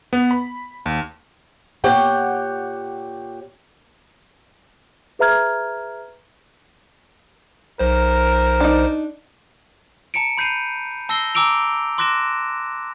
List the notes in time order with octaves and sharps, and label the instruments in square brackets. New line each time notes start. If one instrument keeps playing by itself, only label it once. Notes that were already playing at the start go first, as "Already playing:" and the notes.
[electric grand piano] B3
B5
D#2
[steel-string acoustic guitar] A#2 G4 C#5 F#5 G5
[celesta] G#4 B4 E5 A#5 F6 G#6
[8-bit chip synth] B1 C5 [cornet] A#4
[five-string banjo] D4 D#4
[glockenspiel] A5 A#5 C#7 D7
B5 G6 C7 D#7 F7
A5 E6 A#6 C7 G7
G#5 A#5 D6 E6 D7 F7
C6 D6 F#6 A#6 D7 E7